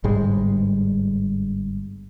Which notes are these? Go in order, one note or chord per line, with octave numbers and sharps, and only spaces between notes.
G1 G#2 G3 G#3